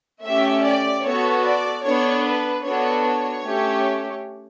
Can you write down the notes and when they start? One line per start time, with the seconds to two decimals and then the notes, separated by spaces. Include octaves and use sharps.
0.24 A3 C#4 G4 E5
0.64 D5
1.04 B3 F#4 A4 C#5
1.45 D5
1.84 B3 D4 A4 C#5
2.24 B4
2.64 B3 D4 F#4 A4 C#5
3.04 C#5
3.44 A3 C#4 G4